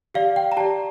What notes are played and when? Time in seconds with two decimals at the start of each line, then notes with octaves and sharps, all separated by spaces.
0.14 G4 D5 F5
0.36 G5
0.52 A#5
0.57 G4 D5 A5